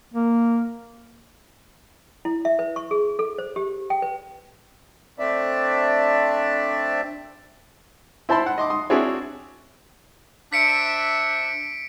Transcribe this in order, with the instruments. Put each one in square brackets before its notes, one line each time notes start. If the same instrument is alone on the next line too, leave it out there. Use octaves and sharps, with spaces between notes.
[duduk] A#3
[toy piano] E4
E5
B4
C#6
G#4
A4
C5
G4
G5
B4
[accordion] A3 C4 D4 D5 E5
[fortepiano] E4 C5 A5 B5 C6
F#5
D#5 C6 D6
C6 D#6
C4 D4 E4 F#4 G#4 C#5
[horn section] D4 C5 E5 [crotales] B6 C#7 D7